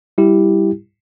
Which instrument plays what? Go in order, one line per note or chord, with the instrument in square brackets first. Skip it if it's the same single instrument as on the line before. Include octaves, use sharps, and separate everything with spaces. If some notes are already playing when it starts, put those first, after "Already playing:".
[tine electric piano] G3 E4 G4